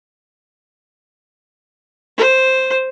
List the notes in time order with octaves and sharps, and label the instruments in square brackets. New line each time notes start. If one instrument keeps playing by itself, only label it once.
[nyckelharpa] C5